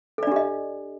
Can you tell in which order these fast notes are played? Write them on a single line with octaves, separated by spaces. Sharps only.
A4 D5 D4 G4 D#5